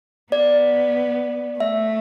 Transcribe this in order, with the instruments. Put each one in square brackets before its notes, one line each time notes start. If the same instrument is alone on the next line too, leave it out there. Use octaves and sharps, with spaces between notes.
[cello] B3 [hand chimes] D5
[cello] A3 [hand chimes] E5